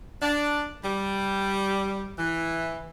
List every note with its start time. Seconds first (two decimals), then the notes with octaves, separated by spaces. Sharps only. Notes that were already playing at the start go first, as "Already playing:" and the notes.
0.20 D4
0.83 G3
2.18 E3